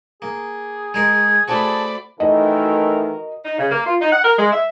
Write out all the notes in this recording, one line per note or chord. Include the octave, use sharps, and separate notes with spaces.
A#3 G#4
G#3 A#4 C6 G#6
A3 C4 F#4 D5 A5 B5
D#3 E3 A3 F#4 A#4 D#5
D#4
C#3
A#3
F4
D#4
F#5
A#4
G#3
E5